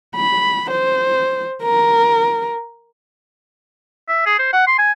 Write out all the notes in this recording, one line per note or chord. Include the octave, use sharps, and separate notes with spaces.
B5
C5
A#4
E5
G#4
C5
F#5
C6
G#5